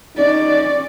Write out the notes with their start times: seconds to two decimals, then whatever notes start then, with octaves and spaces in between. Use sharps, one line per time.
0.17 C#4 D#4 D5